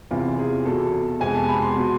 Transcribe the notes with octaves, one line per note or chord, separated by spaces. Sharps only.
E2 C3 E3 F4
G#4
E2 B2 A3 A4
F2 C3 G#3 B3 G#5
A5
B5
C6
B2 B3